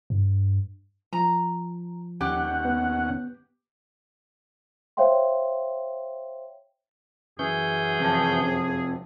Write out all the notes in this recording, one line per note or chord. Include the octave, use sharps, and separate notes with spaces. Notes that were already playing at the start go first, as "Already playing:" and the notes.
G2
F3 A#5
D#2 C#4 G4 F#5
B3
C5 C#5 E5 F5 G5 C6
F#2 E3 C#4 G#4 G6
F2 C3 A5